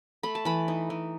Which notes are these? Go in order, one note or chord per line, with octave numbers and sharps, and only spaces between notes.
A3 B5
A5
E3 B5
D#4
E3